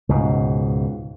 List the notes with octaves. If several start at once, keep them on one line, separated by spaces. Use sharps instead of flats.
C#2 G#2 B2